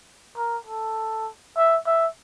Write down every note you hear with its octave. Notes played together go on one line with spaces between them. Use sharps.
A#4
A4
E5
E5